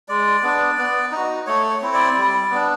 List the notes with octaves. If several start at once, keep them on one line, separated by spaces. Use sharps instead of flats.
G#3 D5
B3 D4
B3
D#4
F#4
A3 C#5
C#5
C4 E4
D5
G3
B3 D4